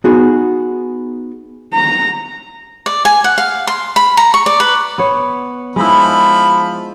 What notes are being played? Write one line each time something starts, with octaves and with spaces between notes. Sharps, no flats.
B3 D#4 F#4 G#4
A#5
D5
G#5
F#5
F5
C6
B5
A#5
C#6
D5
B4
B3 C#5
F3 G#3 D#4 E4 B5